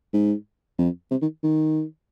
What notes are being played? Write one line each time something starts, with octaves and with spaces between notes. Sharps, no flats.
G#2
F2
C3
D#3
D#3